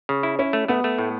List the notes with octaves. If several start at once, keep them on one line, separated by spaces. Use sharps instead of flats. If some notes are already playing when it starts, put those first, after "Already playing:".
C#3
E4
C#4 E4
A3
A3 B3
A3
A2